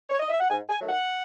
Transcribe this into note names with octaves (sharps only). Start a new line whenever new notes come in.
C#5
D#5
E5
F#5
G#2 G#5
G#5
D#3 F#3 A3
F#5